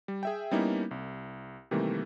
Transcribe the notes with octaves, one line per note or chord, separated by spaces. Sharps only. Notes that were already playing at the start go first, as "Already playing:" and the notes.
G3
G#4 E5 G5
G3 A#3 B3 C#4 D#4 E4
C2
C3 D#3 E3 G3 A3 A#3